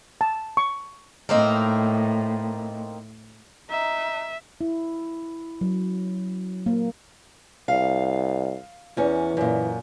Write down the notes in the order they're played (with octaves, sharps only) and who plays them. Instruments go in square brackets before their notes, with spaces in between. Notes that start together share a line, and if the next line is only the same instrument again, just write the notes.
[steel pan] A5
C#6
[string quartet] A2 [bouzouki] A#3 C4 D#4
[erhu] D#4 [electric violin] E5
[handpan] E4
F#3
A#3
[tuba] C2 [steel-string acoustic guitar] F5
[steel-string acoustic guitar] E2 C#4 [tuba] E3
[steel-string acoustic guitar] F#2 A#2